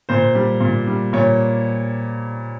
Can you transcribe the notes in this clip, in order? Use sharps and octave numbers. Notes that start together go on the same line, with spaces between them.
A#2 C5
G3
A#2
G3
A#2 C#5